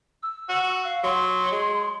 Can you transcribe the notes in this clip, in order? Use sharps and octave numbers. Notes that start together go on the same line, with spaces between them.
E6
F#4
F5
F#3 C6
G#3